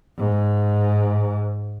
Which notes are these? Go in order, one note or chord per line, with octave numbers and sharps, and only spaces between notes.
G#2